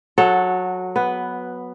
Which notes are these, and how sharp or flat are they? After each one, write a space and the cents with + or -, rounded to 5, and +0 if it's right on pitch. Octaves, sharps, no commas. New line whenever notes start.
F#3 -15 F#4 +0 A4 +0
B3 +0 B4 +5